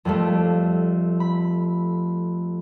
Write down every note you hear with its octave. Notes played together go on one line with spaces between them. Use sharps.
F2 G3 A3
B5